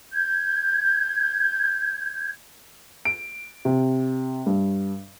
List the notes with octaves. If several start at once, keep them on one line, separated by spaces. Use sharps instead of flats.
G6 G#6
D7
C3
G2